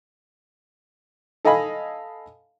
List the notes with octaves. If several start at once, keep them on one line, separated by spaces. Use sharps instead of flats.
A4 D#5 F5 G#5 B5